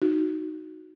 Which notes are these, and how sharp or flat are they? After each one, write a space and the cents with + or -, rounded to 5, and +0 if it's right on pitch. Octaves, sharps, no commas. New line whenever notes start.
D#4 +0 F#4 +0